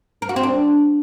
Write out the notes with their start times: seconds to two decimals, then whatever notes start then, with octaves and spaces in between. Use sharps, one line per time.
0.22 A#4
0.29 F#4
0.36 C4
0.43 D4